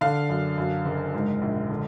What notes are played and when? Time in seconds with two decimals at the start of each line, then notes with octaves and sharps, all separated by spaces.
0.01 D3 F5
0.29 F#2
0.58 F#2
0.86 F#1
1.14 G#2
1.41 A#1
1.70 D3